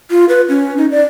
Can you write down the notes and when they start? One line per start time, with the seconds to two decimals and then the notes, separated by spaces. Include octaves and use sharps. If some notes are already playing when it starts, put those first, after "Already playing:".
0.11 F4
0.29 B4
0.49 C#4
0.78 D#4
0.91 D5